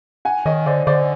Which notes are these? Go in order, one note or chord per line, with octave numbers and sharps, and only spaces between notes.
F#5 G#5
D#3 C#5 D#5
D3 C5 D5
D3 C5 D5